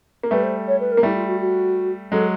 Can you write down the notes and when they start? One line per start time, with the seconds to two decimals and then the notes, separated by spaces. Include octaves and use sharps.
0.23 A#3
0.31 G3 A3 B4
0.43 C5
0.67 C#5
0.80 B4
0.91 A#4
0.97 A#3
1.03 G3 A3 E4
1.15 F4
1.27 F#4
1.40 F#4
2.12 F#3 G#3 A4